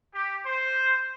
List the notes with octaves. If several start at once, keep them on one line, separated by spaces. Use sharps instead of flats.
G4
C5